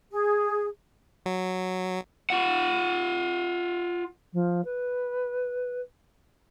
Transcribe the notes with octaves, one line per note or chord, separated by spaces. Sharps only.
G#4
F#3
F4 F#5
F3
B4